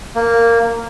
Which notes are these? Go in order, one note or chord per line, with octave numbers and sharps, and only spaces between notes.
A#3